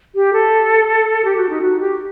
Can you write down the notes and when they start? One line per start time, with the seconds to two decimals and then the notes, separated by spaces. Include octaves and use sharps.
0.15 G4
0.33 A4
1.25 G4
1.37 F#4
1.49 D#4
1.62 F#4
1.80 G4